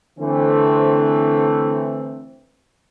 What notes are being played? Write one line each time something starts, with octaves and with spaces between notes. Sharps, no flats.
D3 E3 A3 C4